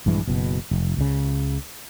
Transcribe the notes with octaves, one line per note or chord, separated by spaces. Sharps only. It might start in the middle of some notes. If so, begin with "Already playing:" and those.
A#1 G2 E3 G#3
F#1 B2
F1
C#2 C#3